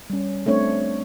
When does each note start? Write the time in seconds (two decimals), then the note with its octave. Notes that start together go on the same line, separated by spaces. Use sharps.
0.10 G3 C#4
0.46 A3 C4 D4 C#5